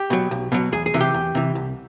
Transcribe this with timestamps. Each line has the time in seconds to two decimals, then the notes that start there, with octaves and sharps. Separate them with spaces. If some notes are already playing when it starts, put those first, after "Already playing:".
Already playing: G4
0.10 B2 F#3
0.31 B1
0.52 B2 F#3
0.72 E2 G#4
0.86 G#4
0.94 C3 E3
1.00 G4
1.14 E2
1.35 C3 E3
1.55 C2